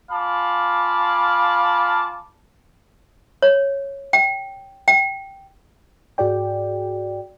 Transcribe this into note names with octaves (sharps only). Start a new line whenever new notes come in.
F4 F5 G#5 A5 B5 D6
C#5
G5
G5
G#2 F#4 G#4 D5 G5